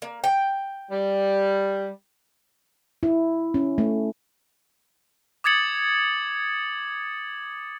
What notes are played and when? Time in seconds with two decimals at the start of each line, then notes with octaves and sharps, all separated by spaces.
0.02 A#3
0.24 G5
0.91 G3
3.03 E4
3.54 C#4
3.78 A3
5.44 D6 D#6 G#6 A6 C#7 F#7